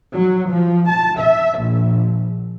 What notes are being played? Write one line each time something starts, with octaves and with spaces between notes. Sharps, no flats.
F#3
F3
A5
E5
A#1